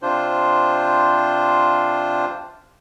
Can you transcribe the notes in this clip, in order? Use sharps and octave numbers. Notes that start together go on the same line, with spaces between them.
C3 D4 F4 C5